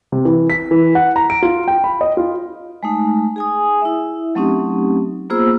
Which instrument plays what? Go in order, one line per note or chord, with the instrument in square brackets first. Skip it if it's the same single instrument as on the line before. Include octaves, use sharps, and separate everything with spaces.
[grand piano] C3
E3
B6
E3
F#5
A#5
D7
F4
G5
B5
D#5
F4
[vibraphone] G#3 A3 D#4
G#4 G#5 D#6
E4 E5
F#3 A3 C4 C#4 D#4 G4
A#3 B3 F4 G#4 C5 E6